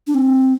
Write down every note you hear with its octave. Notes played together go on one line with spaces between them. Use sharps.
D4
C4